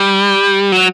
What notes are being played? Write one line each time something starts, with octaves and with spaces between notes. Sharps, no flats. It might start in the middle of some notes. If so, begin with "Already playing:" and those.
Already playing: G3
F#3